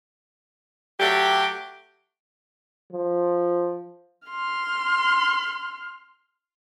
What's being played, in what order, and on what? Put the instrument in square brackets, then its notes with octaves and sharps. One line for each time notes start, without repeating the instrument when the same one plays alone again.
[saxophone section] F#3 A3 G4
[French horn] F3
[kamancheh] C6 F6